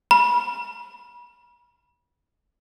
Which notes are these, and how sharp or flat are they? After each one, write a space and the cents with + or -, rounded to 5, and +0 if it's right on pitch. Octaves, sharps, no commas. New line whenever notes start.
B5 -35